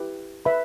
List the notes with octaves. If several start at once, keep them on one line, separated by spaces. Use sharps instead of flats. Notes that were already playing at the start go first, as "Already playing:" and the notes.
Already playing: E4 G4 B4
B4 E5 B5